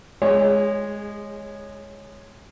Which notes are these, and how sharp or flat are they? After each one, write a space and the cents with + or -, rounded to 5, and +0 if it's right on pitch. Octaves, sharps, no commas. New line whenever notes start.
G#3 +0 G#4 -30 C#5 +0